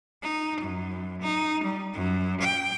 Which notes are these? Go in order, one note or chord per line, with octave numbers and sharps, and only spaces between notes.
D#4
F#2
D#4
G3
F#2
G5